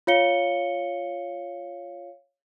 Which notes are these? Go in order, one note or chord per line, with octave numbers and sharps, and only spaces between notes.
F4 C#5 F5 C#7 G7